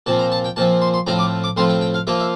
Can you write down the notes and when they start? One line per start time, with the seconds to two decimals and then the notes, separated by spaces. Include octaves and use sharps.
0.06 A#2 F3 C4 A5
0.19 A#5
0.32 A5
0.44 G5
0.56 A#2 F3 C4 A5
0.82 C6
0.94 C6
1.07 A2 F3 C4 F4 A#5
1.19 D6
1.44 D6
1.57 A2 F3 C4 F4 C6
1.69 G5
1.81 G5
1.94 F5
2.07 F3 A#3 F4 E5
2.20 E5